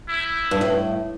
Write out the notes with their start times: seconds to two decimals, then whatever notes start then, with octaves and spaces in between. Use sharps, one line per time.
0.08 E4
0.51 G2
0.61 A2